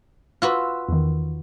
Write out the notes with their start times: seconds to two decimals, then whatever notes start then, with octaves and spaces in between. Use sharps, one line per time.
0.42 F4 F#4 B4 E6
0.89 E2 D#3